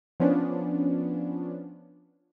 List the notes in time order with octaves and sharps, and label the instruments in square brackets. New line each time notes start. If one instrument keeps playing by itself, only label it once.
[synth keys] F3 B3 C#4 D4